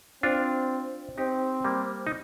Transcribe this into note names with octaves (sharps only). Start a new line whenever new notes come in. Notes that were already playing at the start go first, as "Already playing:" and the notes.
C4 D4 F4
C4 D#4 G4
G3 A#3
D#4